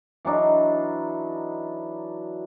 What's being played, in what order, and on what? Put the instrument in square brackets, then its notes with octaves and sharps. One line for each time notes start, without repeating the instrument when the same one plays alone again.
[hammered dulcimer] E3 F#3 D4 D#4